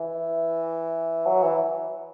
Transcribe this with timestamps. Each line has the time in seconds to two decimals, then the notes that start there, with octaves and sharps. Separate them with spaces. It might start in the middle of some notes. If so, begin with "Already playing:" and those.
Already playing: E3
1.26 F#3
1.43 E3